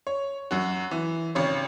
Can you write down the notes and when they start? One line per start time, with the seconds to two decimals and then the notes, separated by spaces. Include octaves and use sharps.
0.07 C#5
0.51 F#2 F#4
0.91 E3
1.35 G#1 C#3 C#5